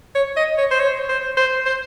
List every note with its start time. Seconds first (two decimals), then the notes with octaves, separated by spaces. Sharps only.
0.15 C#5
0.36 D#5
0.58 C#5
0.71 C5
0.79 C#5
1.09 C5
1.37 C5
1.66 C5